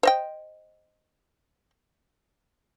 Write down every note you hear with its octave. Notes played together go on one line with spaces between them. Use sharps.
C5 D#5 G5